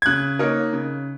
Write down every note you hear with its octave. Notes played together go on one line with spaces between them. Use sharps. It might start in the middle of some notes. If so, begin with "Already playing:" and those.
G#6
C#3 F#6
A#3 D#4 A#4 C#5
C#3